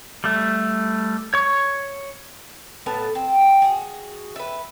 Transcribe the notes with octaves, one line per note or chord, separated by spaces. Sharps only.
G3 A3
C#5 C#6
A2 B3 A5
C4
F#4 G#4
B4 E5